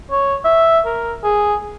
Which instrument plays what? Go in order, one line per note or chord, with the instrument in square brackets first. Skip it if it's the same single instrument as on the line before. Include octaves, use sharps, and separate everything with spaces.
[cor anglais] C#5
E5
A#4
G#4